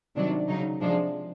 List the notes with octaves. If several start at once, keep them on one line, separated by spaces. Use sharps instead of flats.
C3 D#3 F#3 D4
C#3 F#3 D#4
C3 F3 G#3 D4